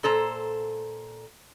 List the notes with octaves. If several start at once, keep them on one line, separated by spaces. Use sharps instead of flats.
A#2 A4 C5 A#5